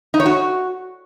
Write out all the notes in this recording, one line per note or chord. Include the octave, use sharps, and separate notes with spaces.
D#4
C#5
F#4